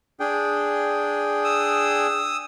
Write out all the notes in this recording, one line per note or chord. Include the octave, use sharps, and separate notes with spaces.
D4 G#4 G5
D#6 E6